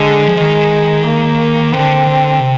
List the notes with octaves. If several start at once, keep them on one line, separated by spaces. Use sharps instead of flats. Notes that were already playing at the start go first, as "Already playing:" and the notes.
Already playing: D3 G#3
F3
D#3 G#3
A#3
D3 C4
D3
C3